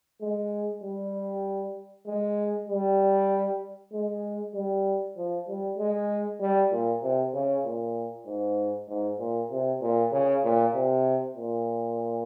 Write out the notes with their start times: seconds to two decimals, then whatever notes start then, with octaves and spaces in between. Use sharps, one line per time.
0.21 G#3
0.83 G3
2.07 G#3
2.69 G3
3.93 G#3
4.54 G3
5.17 F3
5.48 G3
5.78 G#3
6.41 G3
6.71 A#2
7.03 C3
7.34 C#3
7.64 A#2
8.26 G#2
8.88 G#2
9.19 A#2
9.51 C3
9.81 A#2
10.12 C#3
10.43 A#2
10.74 C3
11.36 A#2